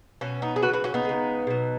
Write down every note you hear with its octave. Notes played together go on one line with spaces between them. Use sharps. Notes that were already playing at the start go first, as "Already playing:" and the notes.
B2 F#3 C#4
B3 D#4
G#4
C#3 F#3 F#4 B4
F#4 B4
C#4 F#4
B3 D#4
C#3 G#3
B2 F#3